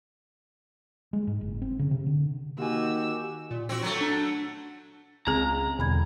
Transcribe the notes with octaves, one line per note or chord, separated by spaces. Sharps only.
G#3
G#2
F#1
C4
C#3
C3
D3
D#3 A#3 F#4 G4 G#5 E6
A#2
C4 F#4 E6
F#3 A3
D4
C#2 C4 G#4 A#5
E2 B2 D3 G3 B5 G#6